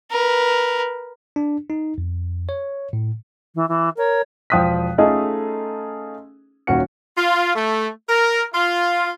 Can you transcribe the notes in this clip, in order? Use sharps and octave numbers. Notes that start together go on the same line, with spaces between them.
A#4 B4
D4
D#4
F2
C#5
A2
E3
E3
A#4 C#5
E1 F3 G5 D#6 F#6 B6
A3 C#4 D#4 F4 G#4 A4
D#1 D#2 C#4 F#4 F#5 C#7
F4
A3
A#4
F4